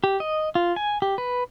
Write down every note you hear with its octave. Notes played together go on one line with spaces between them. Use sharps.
G4
D#5
F4
G#5
G4
B4